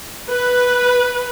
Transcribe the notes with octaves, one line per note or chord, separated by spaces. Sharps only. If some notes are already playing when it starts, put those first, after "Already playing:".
B4